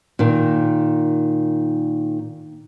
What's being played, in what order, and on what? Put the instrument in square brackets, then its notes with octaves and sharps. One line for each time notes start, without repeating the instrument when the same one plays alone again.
[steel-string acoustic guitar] A#2 D#3